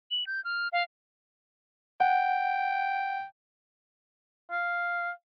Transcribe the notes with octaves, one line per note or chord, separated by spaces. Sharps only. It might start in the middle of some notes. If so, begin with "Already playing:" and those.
F#7
G6
F6
F5
F#5 G5
F5